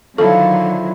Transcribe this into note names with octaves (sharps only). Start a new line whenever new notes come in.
D3 D#3 F3 F#3 E4 A4